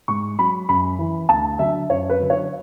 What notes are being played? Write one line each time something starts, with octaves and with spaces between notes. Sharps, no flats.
G#2 C#6
F#3 B5
F#2 B5
E3
D2 A5
D3 F#3 E5
F#2 C#5
B4
D3 F#3
C#5